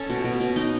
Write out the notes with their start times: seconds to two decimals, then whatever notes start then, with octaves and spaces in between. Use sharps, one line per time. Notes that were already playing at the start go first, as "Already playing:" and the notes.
Already playing: C#4 A4 C#5
0.10 B2
0.24 B2
0.41 B2
0.56 D#4